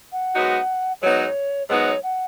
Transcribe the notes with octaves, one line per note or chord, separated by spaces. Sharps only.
F#5
G#2 F#3 B3 D#4 F#4
G#2 F#3 B3 D#4 F#4 C#5
G#2 F#3 B3 D#4 F#4 C#5
F#5